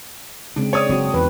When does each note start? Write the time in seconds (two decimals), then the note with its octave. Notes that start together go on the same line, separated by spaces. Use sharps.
0.56 C#3 G#3 C4 D4
0.73 C#5 D5 D#6
0.89 F#1 F#3 C4 D4 F#4
1.14 E2 D#3 B4